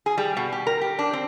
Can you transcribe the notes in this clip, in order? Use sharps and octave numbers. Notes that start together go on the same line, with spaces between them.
G#4
G3
B2
G4
A#4
G4
D4
C4